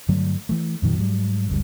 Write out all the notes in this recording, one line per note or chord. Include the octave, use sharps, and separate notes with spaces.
G2 D3 F#3 A3
E3 A3
F2 A#2 D#3 F#3
G#2 F#3 G3
F#1 C#2 G3